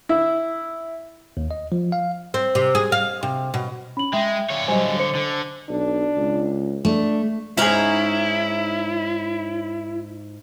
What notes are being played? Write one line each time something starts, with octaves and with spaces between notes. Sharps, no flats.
E4
D#2
D#5
F3
F5
C4
C3
G#4
F5
C3
B2
C#4 B5 F#7
G#3 E5 G5
D3 C#5
F#3 G3 C5 D#5 G#5
C5 C#7
D3
B1 D4
C#2
A3 D4
G#2 C#4 D#4 E4 G#4 A#5